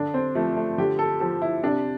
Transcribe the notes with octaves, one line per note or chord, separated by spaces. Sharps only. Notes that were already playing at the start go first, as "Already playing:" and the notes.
Already playing: D3 D4
C4
F3 A3
A3
D3 G4
A4
F3 A4
E4
C3 D4